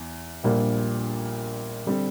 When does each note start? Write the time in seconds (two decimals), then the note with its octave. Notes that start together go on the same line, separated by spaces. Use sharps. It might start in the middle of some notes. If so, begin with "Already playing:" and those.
Already playing: E2
0.44 A#1 A#2 G3 A#3 D4
1.86 D3 G3 C4